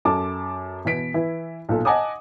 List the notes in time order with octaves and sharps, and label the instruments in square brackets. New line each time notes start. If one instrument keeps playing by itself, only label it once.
[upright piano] F#2 A4 A5 D6
B2 E3 B3 B6 D7
E3 E4
B1 A#2 A4
D#5 F#5 G#5 A5 D6 D#6